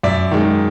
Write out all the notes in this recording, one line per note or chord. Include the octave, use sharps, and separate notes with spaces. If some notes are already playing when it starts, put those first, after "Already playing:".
F#2 D5 E5
D#3 G#3